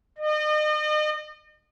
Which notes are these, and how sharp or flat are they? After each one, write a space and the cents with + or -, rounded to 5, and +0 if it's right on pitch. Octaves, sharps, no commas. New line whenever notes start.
D#5 -40